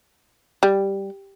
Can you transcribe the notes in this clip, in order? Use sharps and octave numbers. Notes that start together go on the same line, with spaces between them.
G3